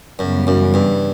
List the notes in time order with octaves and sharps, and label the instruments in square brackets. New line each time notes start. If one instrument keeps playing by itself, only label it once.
[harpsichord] F#2 [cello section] C#3 E3 G3 B3
[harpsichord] F#2
G2